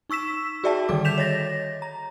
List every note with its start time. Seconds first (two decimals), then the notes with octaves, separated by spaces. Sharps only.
0.10 D#4 C#6 E6 B6 E7
0.64 F#4 G#4 D5 E5 G5 A5
0.89 D3 D#3 G3 A4 D6
1.05 G6 B6 E7 F7
1.18 C#5 D#5 A6 A#6
1.82 A#5